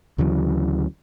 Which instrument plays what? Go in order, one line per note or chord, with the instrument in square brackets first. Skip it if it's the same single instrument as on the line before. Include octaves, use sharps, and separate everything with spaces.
[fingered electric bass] D2 C#3 E3 F#3